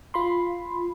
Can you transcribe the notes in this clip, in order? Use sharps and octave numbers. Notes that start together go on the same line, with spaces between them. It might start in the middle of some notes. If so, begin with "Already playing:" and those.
F4 B5 C6